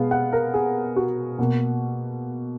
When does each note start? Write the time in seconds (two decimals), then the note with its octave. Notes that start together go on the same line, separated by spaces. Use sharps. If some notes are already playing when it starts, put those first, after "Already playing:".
Already playing: B2 G#3 B3 F5
0.11 F#5
0.33 A#4
0.54 G#4
0.96 F#4
1.39 B2 A#3